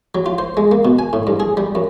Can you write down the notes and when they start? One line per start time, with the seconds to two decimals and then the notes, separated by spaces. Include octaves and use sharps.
0.15 F#3
0.26 F4
0.38 C5
0.57 G#3
0.72 A#3
0.85 B2
0.99 G#5
1.13 A2
1.27 G2
1.40 G#4
1.57 G3
1.75 F#2